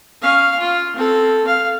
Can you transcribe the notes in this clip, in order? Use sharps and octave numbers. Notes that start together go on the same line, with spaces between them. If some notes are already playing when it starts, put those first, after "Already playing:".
C#4 F5
F4
C4 A4
F5